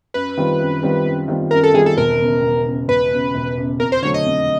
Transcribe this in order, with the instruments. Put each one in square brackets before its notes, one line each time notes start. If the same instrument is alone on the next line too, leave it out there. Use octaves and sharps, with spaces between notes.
[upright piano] F#2 [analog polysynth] B4
[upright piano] D#3 G3 C4 F4
F#2
D#3 G3 C4 F4
F#2
D#3 G3 C4 F4
[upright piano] F#2 [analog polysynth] A#4
[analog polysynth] A4
[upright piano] D#3 G3 C4 F4 [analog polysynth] G#4
[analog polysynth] A4
[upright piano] E1 [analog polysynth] A#4
[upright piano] E2 C#3
E1
E2 C#3
[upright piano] E1 [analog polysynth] B4
[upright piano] E2 C#3
E1
E2 C#3
[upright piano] F2 [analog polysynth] A#4
[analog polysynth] C5
[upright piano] D3 F#3 A3 [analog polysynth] C#5
[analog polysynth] D#5
[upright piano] F2